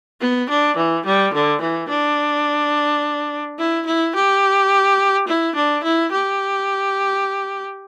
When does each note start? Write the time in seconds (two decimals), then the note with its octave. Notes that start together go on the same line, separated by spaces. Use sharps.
0.21 B3
0.49 D4
0.76 E3
1.05 G3
1.34 D3
1.61 E3
1.89 D4
3.58 E4
3.86 E4
4.15 G4
5.28 E4
5.55 D4
5.83 E4
6.11 G4